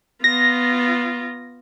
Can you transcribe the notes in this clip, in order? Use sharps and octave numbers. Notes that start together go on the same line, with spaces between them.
B3 F4 A#6